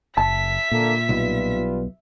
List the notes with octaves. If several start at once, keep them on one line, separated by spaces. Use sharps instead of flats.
F#1 E5 A5 B6
A#2 D3 A#3 A4
B1 G3 F4 B4